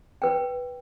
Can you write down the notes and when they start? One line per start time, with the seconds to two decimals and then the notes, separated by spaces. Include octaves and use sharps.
0.22 B4 G5